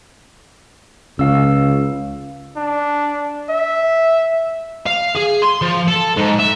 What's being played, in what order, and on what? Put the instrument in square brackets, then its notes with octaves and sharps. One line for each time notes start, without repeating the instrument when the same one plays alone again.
[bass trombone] C#2 [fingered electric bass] C#3 [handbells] F5 E6
[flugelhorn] D4
E5
[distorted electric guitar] F5
G#4
C6
F3
A4
G#2
E5